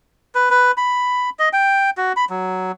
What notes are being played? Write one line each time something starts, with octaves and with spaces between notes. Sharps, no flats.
B4
B4
B5
D#5
G5
F#4
B5
F#3